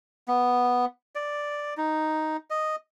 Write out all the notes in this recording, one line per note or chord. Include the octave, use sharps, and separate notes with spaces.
B3
D5
D#4
D#5